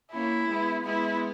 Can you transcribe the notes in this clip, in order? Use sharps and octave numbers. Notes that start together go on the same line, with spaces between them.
A#3 C#4 E4
G#3 B3
G#3 B3 E4